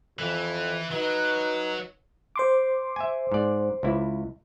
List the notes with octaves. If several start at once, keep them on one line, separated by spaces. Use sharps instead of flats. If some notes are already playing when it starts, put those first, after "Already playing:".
F2 E3
F#3 D#4 B4
C5 C6 D6
E5 G#5
G#2 D5
C#2 E4